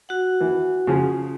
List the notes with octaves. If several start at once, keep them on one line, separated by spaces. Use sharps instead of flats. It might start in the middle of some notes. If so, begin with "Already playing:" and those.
F#4 F#5
E3
C#3 F3 G#4